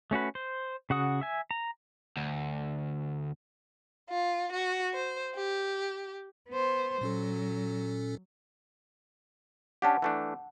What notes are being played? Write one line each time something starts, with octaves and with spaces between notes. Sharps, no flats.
A3 C#4 F#4 B4
C5
C#3 F#4 F#5 D#6
E5 G#5
A#5
D2
F4
F#4
C5
G4
B3 C5
A#2 F#3 C#4 A4
C#4 D4 G4 F#5 A5
E3 A3 D4